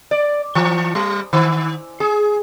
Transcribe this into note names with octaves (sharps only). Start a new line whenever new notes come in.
D5
E3
G3
D#3
G#4